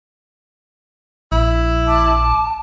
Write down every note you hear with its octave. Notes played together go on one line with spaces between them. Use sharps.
A#1 E4
A5 D6